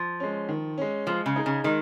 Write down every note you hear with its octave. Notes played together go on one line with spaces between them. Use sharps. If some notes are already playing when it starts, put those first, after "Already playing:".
Already playing: F3
G#3 C#4
D#3
G#3 C#4
F3 G#3
C#3
D#4 G#4
C#3
D#3 G#3